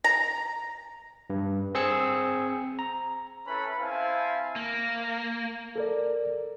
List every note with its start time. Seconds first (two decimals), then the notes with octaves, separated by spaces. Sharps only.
0.04 A#5
1.30 G2
1.75 C4 G#4 E6 C#7
2.79 A#5
3.47 C#4 E4 A4 B4 B5
3.79 C4 E4 C5 F5 G#5 A5
4.56 A#3
5.76 A4 A#4 D5